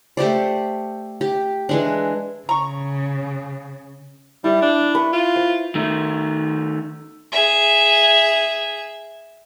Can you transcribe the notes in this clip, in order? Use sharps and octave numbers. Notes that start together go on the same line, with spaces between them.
A3 G4 C5 D5
G4
E3 G#3 D4
C#3 A#5 C#6
G3 E4 E5
D4
B4 C#6
F4
C5
D#3 A3
G#4 E5